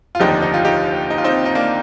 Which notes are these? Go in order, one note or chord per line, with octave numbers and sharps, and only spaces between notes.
F4
F1 D#2 D3 F3 D#4 G4
D#4
F4
D#4 G4
D#4
F4
C4 D#4
D#4
A#3 D4